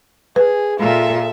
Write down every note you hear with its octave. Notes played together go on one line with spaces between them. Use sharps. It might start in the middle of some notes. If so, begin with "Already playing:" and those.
G#4 B4
A#2 F4 A4 E5